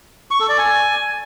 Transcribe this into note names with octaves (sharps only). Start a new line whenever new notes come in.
C#6
A4
D5
G#5